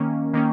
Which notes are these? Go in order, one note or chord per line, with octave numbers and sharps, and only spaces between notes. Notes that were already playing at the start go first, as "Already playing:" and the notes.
Already playing: D#3 A#3 C#4
D#3 A#3 C#4